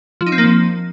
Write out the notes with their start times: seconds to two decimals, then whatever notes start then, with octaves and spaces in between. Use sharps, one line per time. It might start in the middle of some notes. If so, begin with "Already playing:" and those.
0.21 F3
0.26 D#4
0.32 C4
0.38 A#3
0.44 F3